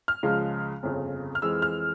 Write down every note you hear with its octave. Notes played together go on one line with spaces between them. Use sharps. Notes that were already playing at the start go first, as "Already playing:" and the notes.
F6
C#2 C#3 F3 G#3
G1 F2 C#3
F6
F2 E3 G#3 E6
F6